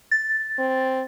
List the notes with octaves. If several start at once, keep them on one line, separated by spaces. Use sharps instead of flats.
A6
C4